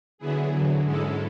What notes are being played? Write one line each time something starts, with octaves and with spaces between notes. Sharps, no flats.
D3 F#3 B3 E4 G#4
E2 D3 F#3
G#2 G#3 C#4 E4 A4